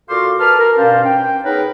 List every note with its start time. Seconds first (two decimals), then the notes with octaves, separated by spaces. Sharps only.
0.09 A#2 F#4 A4 F5 C6 D6
0.39 A#4 B4 A5 F6
0.58 A#4
0.77 G2 B2 C#4 C5 D5 F5
1.04 G5
1.43 B3 D#4 G#4 A#4 B4 C#5